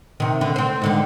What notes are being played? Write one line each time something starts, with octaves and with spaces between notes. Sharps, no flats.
C3 D#3
D3
C4 C5
G#2 D3 D#3